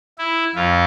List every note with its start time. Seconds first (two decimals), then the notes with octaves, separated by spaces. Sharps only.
0.18 E4
0.55 F2 F4